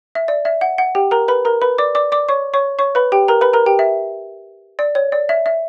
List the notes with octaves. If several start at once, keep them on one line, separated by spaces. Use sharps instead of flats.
E5
D5
E5
F#5
F#5
G4 G5
A#4 A#5
B4 B5
A#4 A#5
B4 B5
D5 D6
D5 D6
D5 D6
C#5 C#6
C#5 C#6
C#5 C#6
B4 B5
G4 G5
A#4 A#5
B4 B5
A#4 A#5
G4 G5
E5
D5
C#5
D5
E5
E5